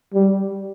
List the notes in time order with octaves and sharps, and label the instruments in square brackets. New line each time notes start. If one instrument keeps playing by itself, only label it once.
[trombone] G3